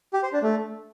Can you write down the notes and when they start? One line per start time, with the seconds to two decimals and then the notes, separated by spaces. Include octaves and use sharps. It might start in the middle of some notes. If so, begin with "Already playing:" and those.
0.13 G4
0.23 C5
0.33 D4
0.42 A3